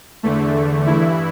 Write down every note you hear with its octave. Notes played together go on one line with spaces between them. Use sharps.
E2 D3 A3
G2 E3 E4